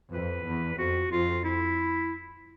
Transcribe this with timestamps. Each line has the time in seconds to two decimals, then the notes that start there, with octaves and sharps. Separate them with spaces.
0.12 F2 B4
0.45 E2
0.78 F2 F#4
1.11 F2 F4
1.44 E4